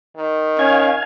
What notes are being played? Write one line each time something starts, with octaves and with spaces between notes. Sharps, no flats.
D#3
C#4 F5 G#5